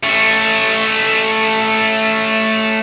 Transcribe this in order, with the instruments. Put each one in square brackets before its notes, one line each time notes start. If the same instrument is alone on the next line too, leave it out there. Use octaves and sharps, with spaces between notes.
[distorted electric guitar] A3 C#4